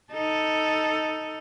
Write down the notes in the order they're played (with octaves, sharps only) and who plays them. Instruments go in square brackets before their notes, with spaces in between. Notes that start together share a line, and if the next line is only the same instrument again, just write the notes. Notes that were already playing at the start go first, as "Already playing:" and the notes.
[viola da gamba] D#4 A4